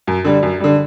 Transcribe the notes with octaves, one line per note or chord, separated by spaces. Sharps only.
F#2
D3 G3
F#2
D3 G3